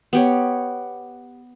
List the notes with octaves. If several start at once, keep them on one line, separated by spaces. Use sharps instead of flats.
B3 G4 C#5